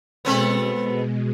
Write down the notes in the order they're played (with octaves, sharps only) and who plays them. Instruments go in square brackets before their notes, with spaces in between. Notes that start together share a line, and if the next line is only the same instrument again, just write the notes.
[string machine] B2 G#3 [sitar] B3 C4 A4